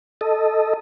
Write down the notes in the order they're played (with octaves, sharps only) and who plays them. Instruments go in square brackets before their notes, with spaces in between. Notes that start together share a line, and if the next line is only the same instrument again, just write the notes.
[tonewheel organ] A4 D#5